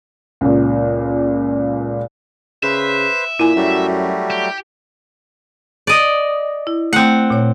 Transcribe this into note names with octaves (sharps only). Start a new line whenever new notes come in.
C#2 A#2
C#3 B4 C5 E5
A#2 E4 G#5
F#2 F#3 G3 A3
G4
D5 D#5
E4
A3 C4 F#5
A#2 C#5